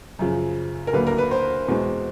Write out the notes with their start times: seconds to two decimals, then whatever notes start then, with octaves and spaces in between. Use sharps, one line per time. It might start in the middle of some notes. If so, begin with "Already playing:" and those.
0.19 F#2 C#3 F3
0.87 A#4
0.93 D2 D3 F#3 A#3 B4
1.07 A#4
1.18 B4
1.31 C5
1.68 E2 B2 G#3 C4